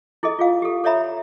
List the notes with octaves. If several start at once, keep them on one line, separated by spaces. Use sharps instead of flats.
E4 G#4 A4 D#5
F4 G#4 F5
G4 A4
A4 C#5 D5 E5 A#5 B5